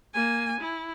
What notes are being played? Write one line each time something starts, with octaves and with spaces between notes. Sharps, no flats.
A#3 G#5
E4